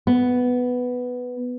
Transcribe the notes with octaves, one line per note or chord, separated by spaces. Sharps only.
B3